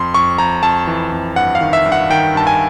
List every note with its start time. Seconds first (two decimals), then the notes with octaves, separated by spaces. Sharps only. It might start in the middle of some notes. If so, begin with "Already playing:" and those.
Already playing: F2 C6
0.14 F2 C#6
0.38 F2 A#5
0.63 F2 A5
0.87 E3
1.12 F2
1.36 G2 F#5
1.55 F5
1.61 D#3
1.73 E5
1.86 G2
1.92 F#5
2.10 D#3 G5
2.35 G2 A5
2.47 G#5